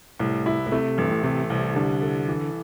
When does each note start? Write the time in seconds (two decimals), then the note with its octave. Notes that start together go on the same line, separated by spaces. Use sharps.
0.19 C2 A2
0.46 E4
0.67 A2
0.72 C3 A3
0.98 A1 G2
1.11 A2
1.23 C3 A3
1.50 C2
1.76 D3 G3
2.02 A4
2.28 E3